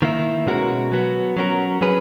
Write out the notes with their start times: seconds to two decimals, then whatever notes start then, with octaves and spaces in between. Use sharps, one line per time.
0.02 D#3 A#3 E4
0.47 B2 G#3 C#4 F#4 A#4
0.92 F#3 B3 F#4
1.37 F#3 C#4 F#4 A#4
1.81 F#3 C#4 G#4 B4